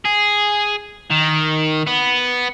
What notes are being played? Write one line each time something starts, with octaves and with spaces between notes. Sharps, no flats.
G#4
D#3
B3